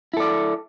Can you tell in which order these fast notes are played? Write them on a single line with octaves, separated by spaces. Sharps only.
E4 A4 D5